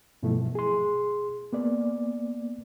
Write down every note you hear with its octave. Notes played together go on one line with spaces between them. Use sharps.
G2 B2 F3 F#3 A3 E4
G#4 C6
A#3 B3 D5